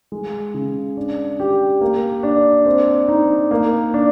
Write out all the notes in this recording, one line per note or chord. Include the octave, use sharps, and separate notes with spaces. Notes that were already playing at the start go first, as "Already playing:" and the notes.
G#3
C#3
D4
G4
A#3
D4
C4
D#4
A#3
D4